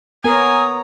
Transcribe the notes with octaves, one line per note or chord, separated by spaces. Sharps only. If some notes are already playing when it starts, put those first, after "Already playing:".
B3 A#4 C#5 G#5 A#5 D#6